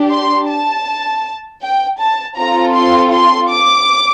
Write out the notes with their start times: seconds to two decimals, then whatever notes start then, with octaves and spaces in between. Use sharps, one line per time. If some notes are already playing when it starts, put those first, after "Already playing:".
Already playing: D4 G4
0.10 C6
0.48 A5
1.61 G5
1.99 A5
2.37 C4 F4 A4 A#5
2.75 C6
3.12 C6
3.50 D6